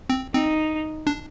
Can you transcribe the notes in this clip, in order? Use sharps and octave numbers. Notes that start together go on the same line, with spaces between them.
C4
C4 D#4
D4